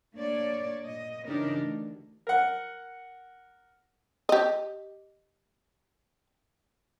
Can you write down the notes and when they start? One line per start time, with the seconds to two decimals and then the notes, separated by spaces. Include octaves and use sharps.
0.14 A#3 D4 C#5 D5
0.85 A#2 D#5
1.27 C#3 E3 D4 D#4 G4 A#4
1.59 D2
2.27 A#4 F#5
4.29 G4 D#5